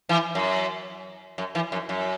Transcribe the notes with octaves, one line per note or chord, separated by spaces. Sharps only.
E3
F#2
F#2
E3
F#2
F#2